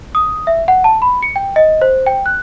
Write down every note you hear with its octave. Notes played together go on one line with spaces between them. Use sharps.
D#6
E5
F#5
A5
B5
C#7
G5
D#5
C5
G5
F#6